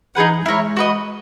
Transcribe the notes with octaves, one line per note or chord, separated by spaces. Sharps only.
E3 D#4 G#4 B4 F#5
G#3 E4 A#4 C#5
F#4 B4 D#5